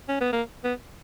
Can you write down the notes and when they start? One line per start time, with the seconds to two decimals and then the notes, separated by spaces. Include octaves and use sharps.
0.08 C#4
0.21 B3
0.33 A#3
0.64 B3